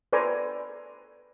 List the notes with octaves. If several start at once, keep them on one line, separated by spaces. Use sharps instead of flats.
A4 B4 C5 D5 G#5 A#5